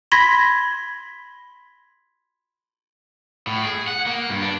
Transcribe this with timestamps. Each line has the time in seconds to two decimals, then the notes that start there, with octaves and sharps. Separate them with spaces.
0.12 B5 C6 G#6 A#6 B6
3.47 A2
3.65 G#4
3.88 F#5
4.07 A#3
4.29 G2
4.42 D4